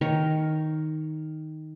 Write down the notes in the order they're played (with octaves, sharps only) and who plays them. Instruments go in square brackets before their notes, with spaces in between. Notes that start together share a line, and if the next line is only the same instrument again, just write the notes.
[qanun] D#3 A#4 C#5